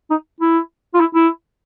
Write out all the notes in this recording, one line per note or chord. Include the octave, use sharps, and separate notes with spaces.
D#4
E4
F4
E4
E4